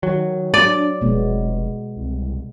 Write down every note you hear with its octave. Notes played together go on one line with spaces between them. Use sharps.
D#3 F#3
D4 D5
F1 B2 G#3 B3
C2